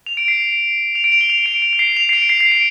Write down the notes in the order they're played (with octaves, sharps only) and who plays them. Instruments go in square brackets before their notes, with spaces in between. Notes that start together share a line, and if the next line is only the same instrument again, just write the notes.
[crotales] F7
D7
C7
F7
D7
F7
G7
F7
D7
D7
D7
C7
F7
C7
D7
C7
C7
D7